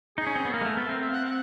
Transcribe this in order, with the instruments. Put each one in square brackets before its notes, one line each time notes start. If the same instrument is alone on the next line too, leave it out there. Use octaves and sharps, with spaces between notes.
[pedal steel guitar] D#4 [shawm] G#4
[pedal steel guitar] C#4
C4
B3
[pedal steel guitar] A#3 [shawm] A#4
[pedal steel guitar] G#3
A3
[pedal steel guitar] B3 [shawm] A4
[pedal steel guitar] C4 [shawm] A#4
[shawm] E5
F5
F#5
F#5